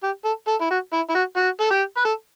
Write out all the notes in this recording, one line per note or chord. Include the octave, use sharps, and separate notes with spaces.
G4
A4
A4
E4
F#4
E4
E4
F#4
F#4
A4
G4
B4
A4